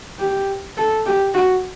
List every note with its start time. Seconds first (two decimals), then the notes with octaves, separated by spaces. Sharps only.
0.19 G4
0.77 A4
1.06 G4
1.34 F#4